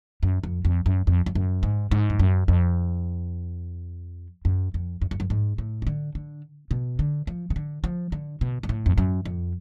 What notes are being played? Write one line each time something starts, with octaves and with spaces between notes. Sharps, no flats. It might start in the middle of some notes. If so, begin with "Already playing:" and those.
F#2
F2
F2
F#2
F2
F2
F#2
G#2
G#2
F2
F#2
F2
F#2
F2
F#2
F2
F#2
G#2
A2
F3
D3
D3
B2
D3
F3
C#3
D3
F3
D3
B2
G#2
A2
F2
F#2
F2